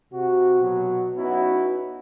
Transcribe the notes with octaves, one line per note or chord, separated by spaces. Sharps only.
C3 F#4
B2 F#3
B3 C#4 D#4 E4 F#4